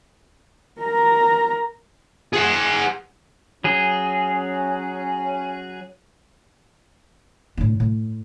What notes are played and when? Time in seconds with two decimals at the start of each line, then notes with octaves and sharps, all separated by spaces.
0.80 A#4 A#5
2.33 G#4 F#5
3.64 F#3 C#4 G#4
7.58 A2 D4
7.80 A2